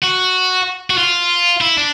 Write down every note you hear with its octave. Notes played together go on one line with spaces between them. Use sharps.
F#4
F#4
F4
E4
D4